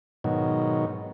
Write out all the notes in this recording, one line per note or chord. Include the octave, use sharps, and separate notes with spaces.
G#2 B2 D#3 F#3